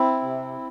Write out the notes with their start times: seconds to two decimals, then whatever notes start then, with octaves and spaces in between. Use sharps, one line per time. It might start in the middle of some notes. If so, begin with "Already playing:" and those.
Already playing: C4 E4
0.22 C3